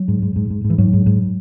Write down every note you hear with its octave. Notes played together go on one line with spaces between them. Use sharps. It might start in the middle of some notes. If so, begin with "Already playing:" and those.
Already playing: F#3
G#2
G#2
G#2
G#2
G#2
E3
G#2 F#3
G#2
G#2